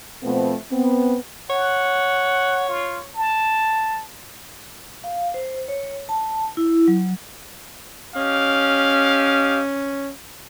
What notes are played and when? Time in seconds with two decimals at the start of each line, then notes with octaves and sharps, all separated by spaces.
0.23 B2 F3 A3 B3 C4
0.71 B3 C4
1.50 C#5 F#5
2.69 F4
3.15 A5
5.04 F5
5.34 C5
5.68 C#5
6.09 A5
6.57 E4
6.88 F#3
8.15 C#4 G4 D#5 F5